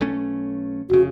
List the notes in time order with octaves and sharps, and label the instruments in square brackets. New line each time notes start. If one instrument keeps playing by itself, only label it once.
[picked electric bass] B1 A3 C#4
[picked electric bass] F1 C#3 [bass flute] F#4